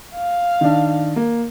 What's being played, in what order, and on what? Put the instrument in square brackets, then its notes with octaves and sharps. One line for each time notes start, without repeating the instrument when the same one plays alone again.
[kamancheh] F5
[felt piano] D#3 D4
A#3